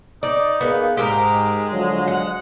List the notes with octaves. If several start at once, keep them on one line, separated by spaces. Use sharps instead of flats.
D#4 D5
B3 G#4 A#4 F5
G#2 G#3 G4 A4 A#4
D3 F3 F#3
F#5